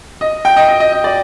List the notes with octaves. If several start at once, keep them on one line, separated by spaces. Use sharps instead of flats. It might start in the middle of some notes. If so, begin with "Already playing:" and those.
D#5
G5
D#5
D#5
D#5
D#5
D5